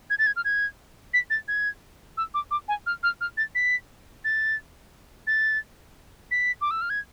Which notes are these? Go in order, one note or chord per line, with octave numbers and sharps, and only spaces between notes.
G#6
A6
G#6
F6
G#6
B6
A6
G#6
E6
D6
D6
G#5
F6
F6
F6
A6
B6
A6
A6
B6
D6
E6
F6
G#6